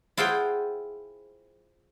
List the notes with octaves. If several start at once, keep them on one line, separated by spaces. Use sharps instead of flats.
E4 F4 G#4 C5 F#5 G5